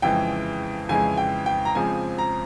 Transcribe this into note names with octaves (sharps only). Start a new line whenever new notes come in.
F2 C#3 E3 G#3 G5
F2 C#3 E3 G#3 G#5
G5
G5
A#5
F2 C#3 F3 G#3 C4 G#5
A#5